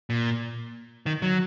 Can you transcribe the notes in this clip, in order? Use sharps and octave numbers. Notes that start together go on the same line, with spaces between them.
A#2
D#3
F#3